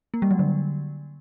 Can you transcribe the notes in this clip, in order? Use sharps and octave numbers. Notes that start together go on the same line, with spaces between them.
A#3
G3
F#3
D3